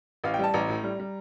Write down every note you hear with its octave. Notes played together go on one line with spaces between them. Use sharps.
A1 F5
G5
G3 A5
A1 A#5
A2
G3
G3